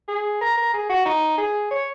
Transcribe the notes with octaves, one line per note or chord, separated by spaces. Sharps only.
G#4
A#4
A#4
G#4
F#4
D#4
G#4
C#5